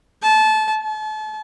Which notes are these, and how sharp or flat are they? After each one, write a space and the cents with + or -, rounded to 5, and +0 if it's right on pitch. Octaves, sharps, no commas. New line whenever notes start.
A5 -25
A5 -35